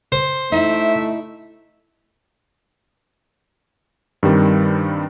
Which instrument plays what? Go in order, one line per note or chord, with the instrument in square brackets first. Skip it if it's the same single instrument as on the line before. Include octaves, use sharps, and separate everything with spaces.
[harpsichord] C5
[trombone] A3 [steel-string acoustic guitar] D#4 E4 [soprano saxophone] E5
[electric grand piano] G2 D#3 G3 C4